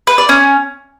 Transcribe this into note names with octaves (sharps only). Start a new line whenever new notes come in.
B4
D5
C#4